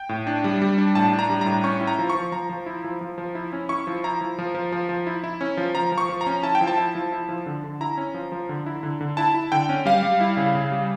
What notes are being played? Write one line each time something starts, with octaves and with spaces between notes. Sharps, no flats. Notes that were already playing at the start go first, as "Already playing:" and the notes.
Already playing: G5
A2
D4
G3
G3
D4
A2 A5
D4
A#5
G3
A#5
A2
C#4 C#6
E4
A#5
F3
C#6
F3
F3 A#5
F3
E4
F3
F3
F3
E4
C#4
E4 C#6
F3
E4 A#5
F3
F3
F3
F3
F3
E4
E4
C#4
F3
F3 A#5
F3
C#6
F3
A#5
C#4
E4 A5
G5
F3
A5
E4
F3
E4
F3
D3
D3
E4 A#5
C#4
F3
F3
D3
E4
D3
D3
E4 A5
E4
D3 G5
C#4
G3 F5
G3
E4
C#3
C#3
G3